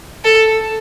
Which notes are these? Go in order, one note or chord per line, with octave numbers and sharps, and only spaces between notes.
A4